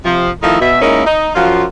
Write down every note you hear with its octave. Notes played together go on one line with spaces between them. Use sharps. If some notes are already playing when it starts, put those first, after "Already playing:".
C3 F3
D#3 F3 A3 D#4 E4
B2 E5
G#3 A#3 C#4 D#4 E4 A#4
D#4
F#2 F3 F#3 F4